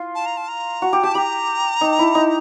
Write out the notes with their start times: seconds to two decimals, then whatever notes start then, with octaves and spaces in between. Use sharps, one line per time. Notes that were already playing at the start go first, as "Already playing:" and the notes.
Already playing: F4
0.15 A5
0.26 A#5
0.37 A5
0.48 A#5
0.82 F#4
0.93 G4
1.03 G4 A5
1.15 G4 A#5 B5
1.81 D#4
1.99 E4
2.15 D#4